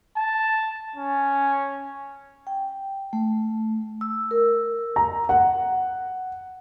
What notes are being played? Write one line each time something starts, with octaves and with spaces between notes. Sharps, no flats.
A5
C#4
G5
A3
E6
A#4
A#5
F#5